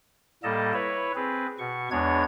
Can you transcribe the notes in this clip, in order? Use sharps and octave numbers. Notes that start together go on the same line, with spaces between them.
A2 G3 A#3 A4 D#5 A5
E4 B4 C#5
C4 G#4 B4
B2 C#6
E2 G#3 B3 D4 C#5 G#6